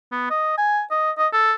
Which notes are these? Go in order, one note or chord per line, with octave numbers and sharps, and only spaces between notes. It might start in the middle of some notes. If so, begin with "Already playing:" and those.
B3
D#5
G#5
D#5
D#5
A4